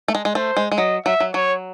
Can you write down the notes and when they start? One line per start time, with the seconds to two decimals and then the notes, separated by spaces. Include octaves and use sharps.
0.08 A3
0.15 G#3
0.25 G#3
0.35 A3 C5
0.57 G#3
0.72 G#3
0.77 F#3 D#5
1.06 F#3 E5
1.20 F#3
1.34 F#3 C#5